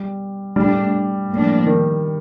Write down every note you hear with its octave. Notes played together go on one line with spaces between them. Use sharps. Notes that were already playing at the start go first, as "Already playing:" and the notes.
Already playing: G3
A2 G3 A3 D4
A2 F3 A#3 D4
D#3